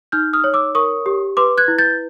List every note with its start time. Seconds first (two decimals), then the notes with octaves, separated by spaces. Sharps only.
0.12 D#4 F6 G6
0.33 D#6 F6
0.44 C#5
0.54 D6 E6
0.75 A#4 C#6 D#6
1.06 G4
1.37 B4 C6 D6
1.58 F#6 G#6
1.68 E4
1.78 G6 A6